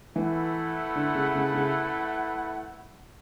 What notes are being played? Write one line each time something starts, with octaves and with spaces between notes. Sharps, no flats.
E3 A3 E4 B4 F#5
D3
C#3
C#3
C#3